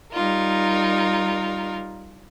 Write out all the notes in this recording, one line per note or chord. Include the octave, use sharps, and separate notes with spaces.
G3 D#4 F4 A#4